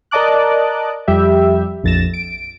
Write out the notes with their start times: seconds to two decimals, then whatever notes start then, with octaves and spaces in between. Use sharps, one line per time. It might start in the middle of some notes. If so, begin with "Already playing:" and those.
0.11 A#4 D5 D#5 A5 D6 F#6
1.08 F2 G3 G4 E5
1.84 A#1 F2 A6 A#6 E7
2.14 D7